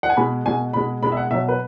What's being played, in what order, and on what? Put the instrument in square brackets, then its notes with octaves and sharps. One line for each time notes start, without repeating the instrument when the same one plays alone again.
[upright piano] F#5
G#5
B2 G#3 B5
B2 G#3 G#5
B2 G#3 B5
B2 G#3 B5
E5
F#5
B2 E5
F#3
B4